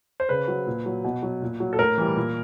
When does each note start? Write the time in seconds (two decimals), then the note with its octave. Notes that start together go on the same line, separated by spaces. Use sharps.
0.20 C5
0.29 C#3 B4
0.48 F#3
0.67 A#2
0.86 F#3
1.04 B2
1.22 F#3
1.42 A#2
1.60 F#3
1.73 A4
1.79 A2 A#4
1.98 E3 G3
2.16 A#2